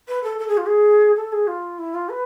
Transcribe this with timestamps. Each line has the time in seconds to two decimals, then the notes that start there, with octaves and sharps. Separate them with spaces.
0.08 B4
0.24 A4
0.39 A4
0.48 G#4
0.57 F4
0.66 G#4
1.16 A4
1.32 G#4
1.47 F4
1.79 E4
1.94 F4
2.09 B4